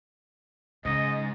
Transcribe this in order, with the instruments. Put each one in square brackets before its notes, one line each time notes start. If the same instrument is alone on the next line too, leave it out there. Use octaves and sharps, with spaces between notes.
[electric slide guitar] G#2 [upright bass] C#3 [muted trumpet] D#5